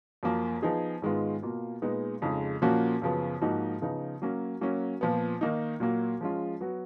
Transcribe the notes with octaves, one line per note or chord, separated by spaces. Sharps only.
F#2 F3 A#3
F3 B3 D#4 G#4
G#2 D#3 G#3 B3 F4
B2 A#3 F4
A#2 G#3 B3 D#4
F2 C#3 G#3 D#4
A#2 F3 A#3 C#4 F#4
F#2 C#3 F3 B3
G#2 F3 A#3 D#4 F#4
C#3 F3 B3 D#4
F#3 A#3 C#4
F#3 A#3 C#4
A#2 F3 B3
D#3 A#3 D#4
A#2 F#3 A#3
F3 G#3 C#4 F4
F#3 B3 F#4